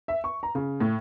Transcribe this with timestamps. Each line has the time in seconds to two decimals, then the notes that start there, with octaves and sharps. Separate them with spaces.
0.08 E5
0.24 C#6
0.43 A#5
0.55 C#3
0.80 A2